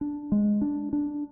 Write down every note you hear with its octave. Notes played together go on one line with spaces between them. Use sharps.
D4
G#3
D4
D4